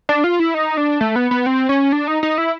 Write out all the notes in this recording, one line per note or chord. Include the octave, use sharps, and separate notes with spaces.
D4
F4
E4
D#4
D4
A3
B3
B3
C4
C#4
D4
D#4
D#4
E4